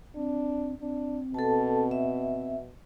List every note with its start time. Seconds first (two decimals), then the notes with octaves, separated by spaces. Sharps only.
0.15 C4 D4
0.81 C4 D4
1.34 B2 A4 A5
1.91 E5